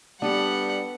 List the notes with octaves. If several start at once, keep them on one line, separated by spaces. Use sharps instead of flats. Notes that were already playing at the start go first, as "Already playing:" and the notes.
G3 B3 D4 G4 A4 B4 F#5